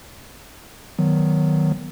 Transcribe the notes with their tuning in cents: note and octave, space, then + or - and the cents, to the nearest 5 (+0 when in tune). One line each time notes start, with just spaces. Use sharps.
D#3 +0 F#3 +0 B3 +0